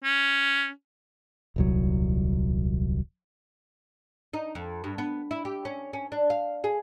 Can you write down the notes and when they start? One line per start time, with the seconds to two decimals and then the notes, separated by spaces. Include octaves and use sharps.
0.04 C#4
1.56 D#1 C2 F#3
4.34 D#4
4.55 F2
4.84 G2
4.98 B3
5.31 E4
5.45 G4
5.65 C#4
5.93 C#4
6.12 D4
6.30 F5
6.64 G#4